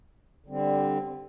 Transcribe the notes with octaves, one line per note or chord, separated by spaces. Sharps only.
D3 G3 C4